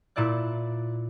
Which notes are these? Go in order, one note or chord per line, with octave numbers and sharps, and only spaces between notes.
A#2 E4 D5 F#6